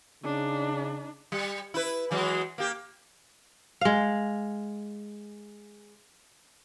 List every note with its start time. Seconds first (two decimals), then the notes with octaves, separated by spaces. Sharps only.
0.24 C#3 D4 D#4
1.32 G3
1.74 E4 B4
2.11 E3 F#3 G#3
2.58 A#3 G4
3.81 G#3 F5